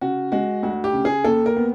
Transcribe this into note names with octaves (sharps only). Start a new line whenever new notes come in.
C#3 F#4
G#3 F#4
D2 F#4
G4
C#3
G#4
D#2 A4
A#4
B3